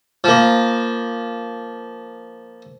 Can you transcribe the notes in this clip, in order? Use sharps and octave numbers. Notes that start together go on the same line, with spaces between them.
F3 A#3